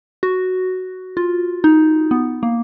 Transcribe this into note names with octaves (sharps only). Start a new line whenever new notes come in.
F#4
F4
D#4
B3
A#3